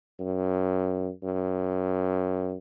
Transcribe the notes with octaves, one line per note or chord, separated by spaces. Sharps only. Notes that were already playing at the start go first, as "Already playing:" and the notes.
F#2
F#2